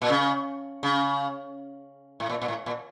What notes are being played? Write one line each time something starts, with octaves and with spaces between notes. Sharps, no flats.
A#2
C#3
C#3
A2
A#2
A#2
A2
A#2